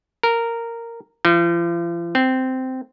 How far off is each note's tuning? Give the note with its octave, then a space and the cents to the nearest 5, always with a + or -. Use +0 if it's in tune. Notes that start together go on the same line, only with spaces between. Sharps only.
A#4 -10
F3 -40
C4 -10